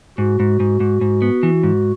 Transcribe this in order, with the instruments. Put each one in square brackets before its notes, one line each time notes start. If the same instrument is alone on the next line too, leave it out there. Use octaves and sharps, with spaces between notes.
[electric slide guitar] G#2 [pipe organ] F#4
[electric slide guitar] G#2
G#2
G#2
G#2
B3
E3
G#2